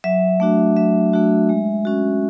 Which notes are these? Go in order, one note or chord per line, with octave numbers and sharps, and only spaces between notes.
F#3 E5
A3 D4 F#4
F#3 E5
A3 D4 F#4
G#3
C#4 F#4